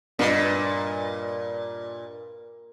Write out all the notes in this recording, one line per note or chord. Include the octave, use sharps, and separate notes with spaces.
G2 A#2 B4 D#5